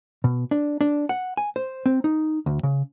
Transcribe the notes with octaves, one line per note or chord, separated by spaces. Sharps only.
B2
D4
D4
F#5
G#5
C5
C4
D#4
D2
C#3